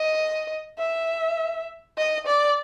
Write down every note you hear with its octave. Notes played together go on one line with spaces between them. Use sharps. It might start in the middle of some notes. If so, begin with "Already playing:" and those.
Already playing: D#5
E5
D#5
D5